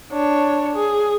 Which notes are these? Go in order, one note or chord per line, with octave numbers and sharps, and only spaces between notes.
D4 C#5
G#4